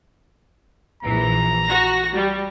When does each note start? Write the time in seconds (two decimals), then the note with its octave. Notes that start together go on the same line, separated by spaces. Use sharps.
1.03 A#1 E3 A#5
1.64 F#4 A#6
2.15 G3